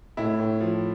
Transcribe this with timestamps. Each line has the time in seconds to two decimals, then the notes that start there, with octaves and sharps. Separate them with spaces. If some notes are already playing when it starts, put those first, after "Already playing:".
0.17 A2 E4
0.39 A2
0.61 F3